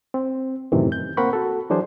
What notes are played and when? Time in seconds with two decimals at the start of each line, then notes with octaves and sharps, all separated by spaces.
0.14 C4
0.72 F#2 A2 C3 D#3 E3
0.92 G6
1.17 A#3 C4 A#4 F#5 B5 C#6
1.33 F#4 A4
1.70 E3 F#3 D4 G#4 C5